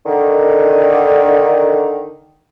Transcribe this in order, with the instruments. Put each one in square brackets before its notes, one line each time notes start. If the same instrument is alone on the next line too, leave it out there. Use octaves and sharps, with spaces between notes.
[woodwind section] D3 D#3